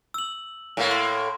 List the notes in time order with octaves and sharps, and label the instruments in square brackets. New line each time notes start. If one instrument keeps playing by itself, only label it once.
[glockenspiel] E6 F#7
[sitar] A2 A#3
[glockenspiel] C6